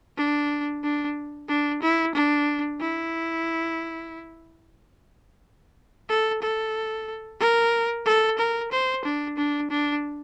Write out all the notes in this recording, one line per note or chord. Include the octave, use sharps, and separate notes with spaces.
D4
D4
D4
E4
D4
E4
A4
A4
A#4
A4
A#4
C5
D4
D4
D4